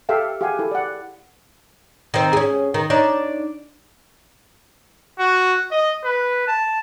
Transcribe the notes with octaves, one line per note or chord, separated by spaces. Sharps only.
G4 A4 E5 F5 G5
G4 G#4 F5 F#5 G#5
E4 A4
D5 F#5
D#3 C4
C#4 G#4
D#3
D4 D#4 C#5
F#4
D#5
B4
A5